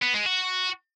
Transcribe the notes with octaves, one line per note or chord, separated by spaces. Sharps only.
B3
G#3
F#4